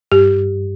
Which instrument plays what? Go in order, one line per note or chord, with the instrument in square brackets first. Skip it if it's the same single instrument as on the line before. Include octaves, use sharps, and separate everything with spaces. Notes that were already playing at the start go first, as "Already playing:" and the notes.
[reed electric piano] G2 [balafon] G4